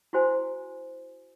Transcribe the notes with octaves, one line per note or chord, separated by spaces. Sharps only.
E4 F#4 C5 G#5